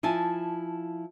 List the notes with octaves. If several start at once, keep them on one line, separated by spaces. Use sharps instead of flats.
F3 E4 G#5 A5